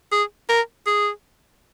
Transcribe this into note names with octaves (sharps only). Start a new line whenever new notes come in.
G#4
A#4
G#4